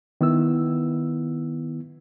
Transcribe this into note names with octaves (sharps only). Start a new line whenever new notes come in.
D#3 B3 E4 E6